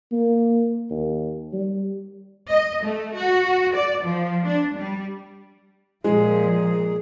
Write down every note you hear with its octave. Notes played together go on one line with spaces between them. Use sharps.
A#3
D#2
G3
D#5
A3
F#4
D5
F3
D4
G3
A#2 F3 G#3 G#4